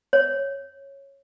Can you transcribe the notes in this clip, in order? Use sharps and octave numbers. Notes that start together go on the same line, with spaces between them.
C#5